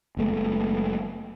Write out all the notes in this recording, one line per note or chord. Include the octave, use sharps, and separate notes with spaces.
F#1 G#3 A3 B3